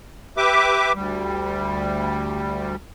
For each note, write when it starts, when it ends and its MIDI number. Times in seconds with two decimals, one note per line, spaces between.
0.37 0.92 67
0.37 0.92 71
0.37 0.92 76
0.37 0.92 86
0.94 2.76 38
0.94 2.76 55